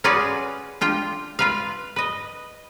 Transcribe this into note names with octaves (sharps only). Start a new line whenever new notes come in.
C#4 F4 F#4 G#4 B4 D5
D4 F4 G5
F4 B4 F5
B4 D#5